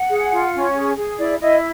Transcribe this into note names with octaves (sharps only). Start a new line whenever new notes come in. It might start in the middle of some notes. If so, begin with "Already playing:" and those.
Already playing: F#5
G#4
F4
C#4
G#4
G#4
E4 D5
E4 D#5